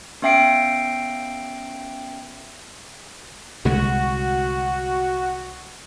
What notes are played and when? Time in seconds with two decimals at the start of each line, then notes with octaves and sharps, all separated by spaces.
0.22 B3 C#4 E5 G5 C7 D7
3.65 C2 D3 G#3 F#4